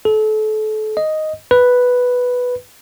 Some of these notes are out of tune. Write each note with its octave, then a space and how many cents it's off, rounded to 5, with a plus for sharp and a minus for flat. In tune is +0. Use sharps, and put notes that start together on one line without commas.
A4 -30
D#5 +0
B4 +0